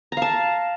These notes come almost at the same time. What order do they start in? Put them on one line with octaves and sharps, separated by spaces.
A#5 F5 A5